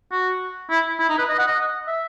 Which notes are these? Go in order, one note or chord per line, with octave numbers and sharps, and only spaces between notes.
F#4
E4
E4
D#4
B4
D#5
F#5
D#5
E5